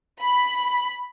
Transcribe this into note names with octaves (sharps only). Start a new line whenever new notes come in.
B5